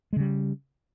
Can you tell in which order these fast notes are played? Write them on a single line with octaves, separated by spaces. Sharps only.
G#3 C#3 G3